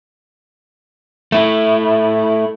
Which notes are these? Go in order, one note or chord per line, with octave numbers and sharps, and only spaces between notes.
A3 E4